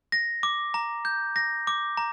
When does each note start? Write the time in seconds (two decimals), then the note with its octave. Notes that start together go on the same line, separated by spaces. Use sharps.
0.12 A#6
0.43 D6
0.74 A#5
1.05 G6
1.36 A#6
1.67 D6
1.97 A#5